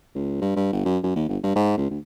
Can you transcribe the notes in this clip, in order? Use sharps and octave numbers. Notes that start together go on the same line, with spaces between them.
C#2
G2
G2
G1
F#2
F#2
D#2
G1
G2
G#2
C#2
D2